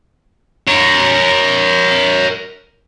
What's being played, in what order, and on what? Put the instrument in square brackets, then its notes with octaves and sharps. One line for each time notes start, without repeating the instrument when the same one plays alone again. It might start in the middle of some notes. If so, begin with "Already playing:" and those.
[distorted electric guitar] A#4 C#5